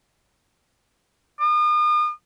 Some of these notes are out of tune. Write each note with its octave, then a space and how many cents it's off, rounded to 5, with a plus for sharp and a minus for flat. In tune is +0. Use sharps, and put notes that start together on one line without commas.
D#6 -40